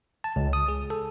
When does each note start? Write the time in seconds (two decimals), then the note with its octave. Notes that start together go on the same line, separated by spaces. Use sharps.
0.24 A5
0.36 C#2
0.53 D#6
0.68 G#4
0.90 A4